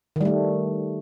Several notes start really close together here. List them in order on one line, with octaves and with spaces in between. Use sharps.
D#3 G3 A3